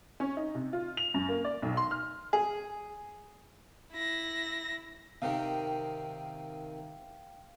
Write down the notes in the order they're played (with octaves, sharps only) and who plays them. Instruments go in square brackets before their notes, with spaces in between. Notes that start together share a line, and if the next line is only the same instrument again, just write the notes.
[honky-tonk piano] C#4
D#4
C3
F4
F7
F#2
A#3
D5
B1
C6
F6
[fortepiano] G#4
[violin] E4 A#6
[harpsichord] C3 D#3 [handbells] F5 G5